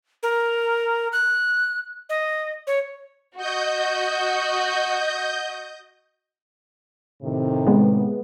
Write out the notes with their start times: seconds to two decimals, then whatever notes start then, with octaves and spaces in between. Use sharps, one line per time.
0.23 A#4
1.13 F#6
2.09 D#5
2.67 C#5
3.37 F#4 D#5 G6
7.22 A2 C3 D#3
7.67 G#3 B3